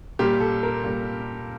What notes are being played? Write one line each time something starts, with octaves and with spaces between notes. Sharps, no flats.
A#2 G3 A#3 G4
A4
A#4
A#2 G3 A#3